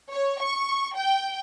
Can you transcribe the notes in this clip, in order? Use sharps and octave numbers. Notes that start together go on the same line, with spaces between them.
C#5
C#6
G5